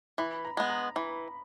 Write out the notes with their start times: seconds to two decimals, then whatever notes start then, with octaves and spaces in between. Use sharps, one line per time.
0.18 E3 B5
0.45 A#5
0.57 G#3 B3
0.70 A#5
0.96 E3 B5